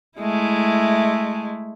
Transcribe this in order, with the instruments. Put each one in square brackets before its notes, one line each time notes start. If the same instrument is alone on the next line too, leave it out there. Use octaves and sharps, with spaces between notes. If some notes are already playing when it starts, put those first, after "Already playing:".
[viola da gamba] G#3 A3 E4